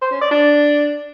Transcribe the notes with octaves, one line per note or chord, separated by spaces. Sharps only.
C5
C#4
D5
D4